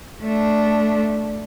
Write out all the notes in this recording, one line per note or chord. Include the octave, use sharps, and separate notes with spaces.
A3 D4